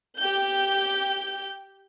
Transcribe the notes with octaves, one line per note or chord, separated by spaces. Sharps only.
G4 G6